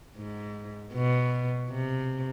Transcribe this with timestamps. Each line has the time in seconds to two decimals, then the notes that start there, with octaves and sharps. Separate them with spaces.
0.16 G#2
0.94 B2
1.71 C3